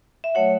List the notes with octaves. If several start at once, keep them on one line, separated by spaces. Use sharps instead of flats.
E5
F#3 A3 F#4 C#5 F#5